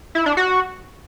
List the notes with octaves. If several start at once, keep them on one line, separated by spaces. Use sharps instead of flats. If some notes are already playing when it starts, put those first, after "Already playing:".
E4
D4
F#4